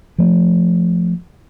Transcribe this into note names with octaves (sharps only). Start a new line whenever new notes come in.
F3 A3